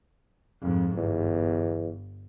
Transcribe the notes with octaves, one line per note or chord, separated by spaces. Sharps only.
F2 G#2
G1 E2